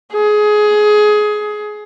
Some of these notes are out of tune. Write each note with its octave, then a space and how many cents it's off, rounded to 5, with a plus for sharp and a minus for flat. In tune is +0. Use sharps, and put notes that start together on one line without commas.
G#4 +20